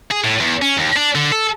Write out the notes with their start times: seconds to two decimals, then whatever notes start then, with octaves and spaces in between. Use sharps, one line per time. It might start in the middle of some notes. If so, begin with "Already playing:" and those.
0.11 G#4
0.24 A2
0.40 E2
0.62 C#4
0.77 D#2
0.96 D4
1.15 D3
1.32 A4